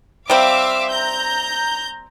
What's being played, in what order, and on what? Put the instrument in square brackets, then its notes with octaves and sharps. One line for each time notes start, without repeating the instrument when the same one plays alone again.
[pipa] G3 C4 [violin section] E5 F5 D6
[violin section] A#5 G6